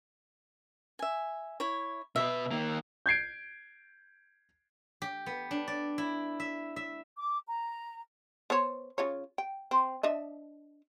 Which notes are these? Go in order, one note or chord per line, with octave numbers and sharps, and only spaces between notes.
E5 G#5
E4 C#5
B2 B4 E5
D#3 A#3
G6 G#6 C7 D7
G4
B3
D4
D5
E4
E5
E5
D6
A#5
B3 C5 C#5
C#3 F4 C#5
G5
C4
D4 D#5 E5